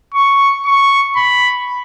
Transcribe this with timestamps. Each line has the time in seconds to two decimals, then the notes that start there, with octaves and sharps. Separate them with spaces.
0.14 C#6
0.65 C#6
1.16 B5